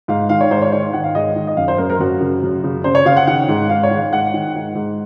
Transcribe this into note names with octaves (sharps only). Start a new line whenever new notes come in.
G#2 F5
D#3 F5
C#5
G#2 C5
C#5
D#3 C#5
D#3 F#5
F5
G#2 D#5
D#3
D#5
F#2 F5
C5
F#2 A#4
A#4
F#2 F#4
C#3
F#2
C#3
C#3 C5
C#5
C#3 F5
F#5
D#3 F#5
G#2
G#2 F5
C#5
D#3
F5
G#2 F#5
D#3
G#2
G#2